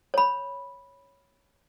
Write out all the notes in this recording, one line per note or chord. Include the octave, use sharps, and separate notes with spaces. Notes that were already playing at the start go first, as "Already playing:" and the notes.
C#5 B5